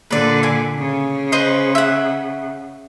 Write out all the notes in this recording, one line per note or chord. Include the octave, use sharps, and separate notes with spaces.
A#2 D3 B4 D5
G#5 D6
C#3
B4 C5 D#5
E5 F#5